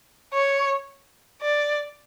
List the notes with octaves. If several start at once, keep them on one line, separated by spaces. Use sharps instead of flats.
C#5
D5